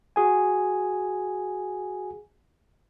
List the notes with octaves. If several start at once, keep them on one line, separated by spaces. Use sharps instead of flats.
F#4 G#4 G#5